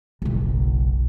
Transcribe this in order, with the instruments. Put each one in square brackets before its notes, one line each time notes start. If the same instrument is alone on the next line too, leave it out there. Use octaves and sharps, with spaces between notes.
[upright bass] F#1 B1